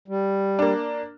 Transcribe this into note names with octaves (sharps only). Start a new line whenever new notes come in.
G3
A#3 D4